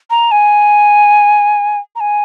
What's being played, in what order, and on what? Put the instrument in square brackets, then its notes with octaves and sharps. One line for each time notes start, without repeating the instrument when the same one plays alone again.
[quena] A#5
G#5
A#5
G#5